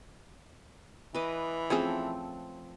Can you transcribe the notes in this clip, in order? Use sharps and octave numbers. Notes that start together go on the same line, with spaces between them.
E3 B4 D#5 D6
F3 A3 C4 C#4 G#4